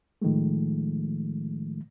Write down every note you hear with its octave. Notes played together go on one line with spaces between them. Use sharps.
A2 D#3 F3 G#3 A3